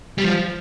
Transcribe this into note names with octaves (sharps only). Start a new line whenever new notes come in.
G3
F3